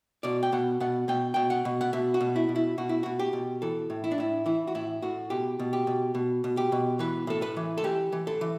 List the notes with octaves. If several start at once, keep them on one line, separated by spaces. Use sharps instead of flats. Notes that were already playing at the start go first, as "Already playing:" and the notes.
B2 D5
G5
B2 F#5
B2 F#5
B2 G5
B2 G5
F#5
B2
F#5
B2 E5
F#4
B2
E4
B2
E4
B2 F#4
E4
B2 F#4
G4
B2
E3 A4
A2
E4
D4
A2 E4
E3 E4
F#4
A2 E4
A2 F#4
B2 G4
B2
G4
B2
B2
B2
G4
B2
E3 B4
A2 A4
B4
E3
A4
E3 G4
E3
A4
E3